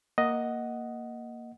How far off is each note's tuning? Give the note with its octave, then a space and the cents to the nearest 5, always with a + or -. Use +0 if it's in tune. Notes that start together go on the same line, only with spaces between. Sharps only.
A#3 +0 D#5 +0 F#5 +0